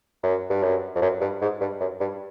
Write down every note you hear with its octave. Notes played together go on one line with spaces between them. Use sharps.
F#2
G2
F#2
F2
F#2
G2
G#2
G2
F#2
G2